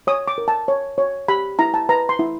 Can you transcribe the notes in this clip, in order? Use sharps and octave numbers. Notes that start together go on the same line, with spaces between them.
C#5 D#6
D6
A#4
A5
C#5
C#5
G4 B5
E4 A#5
A5
B4 A#5
C6
E4